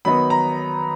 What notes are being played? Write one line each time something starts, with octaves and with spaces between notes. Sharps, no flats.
D#3 F#3 B3 D#4 B5
A#5